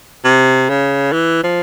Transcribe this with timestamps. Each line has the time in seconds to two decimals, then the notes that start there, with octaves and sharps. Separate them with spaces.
0.25 C3
0.69 C#3
1.13 E3
1.43 F3